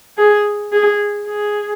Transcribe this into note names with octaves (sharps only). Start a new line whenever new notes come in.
G#4
G#4
G#4